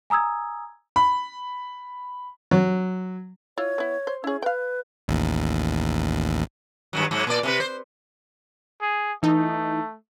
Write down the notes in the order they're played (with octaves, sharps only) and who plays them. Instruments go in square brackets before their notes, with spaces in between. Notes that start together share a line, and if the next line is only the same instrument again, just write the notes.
[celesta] G#5 A#5 D#6 E6 G#6
[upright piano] B5
[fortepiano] F#3
[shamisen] E4 F4 [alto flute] C#5
[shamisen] B3 E4
C5
[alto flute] C#4 [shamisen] E4 G#4
[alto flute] B4 [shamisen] F5 G5
[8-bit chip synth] A1 D#2
[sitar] G2 D#3 F#3
G#2 F#3
A#2 D5
C3 C#4 B4
C5
[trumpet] G#4
[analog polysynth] E3 D#4 [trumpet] A3